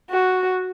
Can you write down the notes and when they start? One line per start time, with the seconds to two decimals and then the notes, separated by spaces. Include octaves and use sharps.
0.10 F#4